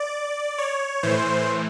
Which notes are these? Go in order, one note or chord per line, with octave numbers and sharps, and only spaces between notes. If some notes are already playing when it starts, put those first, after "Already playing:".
Already playing: D5
C#5
A2 E3 C5